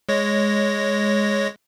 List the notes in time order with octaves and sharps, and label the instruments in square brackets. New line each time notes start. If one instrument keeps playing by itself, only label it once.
[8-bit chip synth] G#3 C#5 A#6